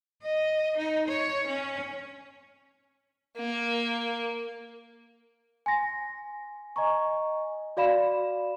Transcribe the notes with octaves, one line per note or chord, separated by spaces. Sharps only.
D#5
D#4
C#5
C#4
A#3
G#5 C6 A#6
D#5 G#5 A#5 C#6
F#4 D5 F5 B5 E7